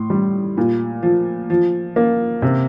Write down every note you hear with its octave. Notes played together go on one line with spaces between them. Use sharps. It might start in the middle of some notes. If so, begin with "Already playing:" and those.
Already playing: A2 C6
G3
A#2
F3
F3
A#3
C3